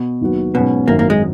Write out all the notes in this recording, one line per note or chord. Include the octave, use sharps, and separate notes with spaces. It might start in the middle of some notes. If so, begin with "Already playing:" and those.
Already playing: B2
D#2 D#3 F#3 B3 F#4
G#2 B2 F#3 C#4 F#4 B4
G#1 F#2 D#3 A#3
A#3
G#3